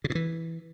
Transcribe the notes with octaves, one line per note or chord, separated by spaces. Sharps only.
C#3
B2
E3